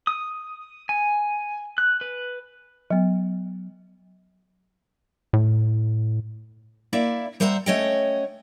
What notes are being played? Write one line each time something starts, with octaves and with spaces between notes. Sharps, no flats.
D#6
G#5
F#6
B4
F#3 B3
A2
A#3 E4 D5 E5
G3 C5 E5 F#5 A5 A#5
A3 C#4 C#5 D#5 F#5 G5